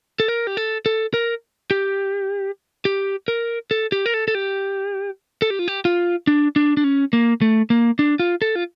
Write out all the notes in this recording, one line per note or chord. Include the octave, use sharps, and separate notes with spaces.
A4
A#4
G4
A4
A4
A#4
G4
G4
A#4
A4
G4
A#4
A4
A4
G4
A4
G4
F4
G4
F4
D4
D4
D4
C#4
A#3
A3
A#3
D4
F4
A4
F4